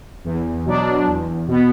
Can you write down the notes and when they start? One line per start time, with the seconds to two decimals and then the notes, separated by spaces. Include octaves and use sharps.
0.24 E2
0.65 B2 F#3 D4
1.07 E2
1.48 B2 B3